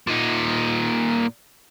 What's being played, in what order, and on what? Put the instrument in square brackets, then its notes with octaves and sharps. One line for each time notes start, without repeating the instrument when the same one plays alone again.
[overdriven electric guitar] A#2 D#4